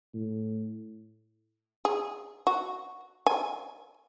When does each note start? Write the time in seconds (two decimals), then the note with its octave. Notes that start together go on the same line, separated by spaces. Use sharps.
0.14 A2
1.85 G#4
2.47 F#4
3.27 G#5